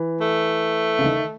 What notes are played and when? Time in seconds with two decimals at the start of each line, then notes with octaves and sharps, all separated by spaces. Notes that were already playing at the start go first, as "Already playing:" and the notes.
Already playing: E3
0.21 A3
0.99 C#3
1.04 D#3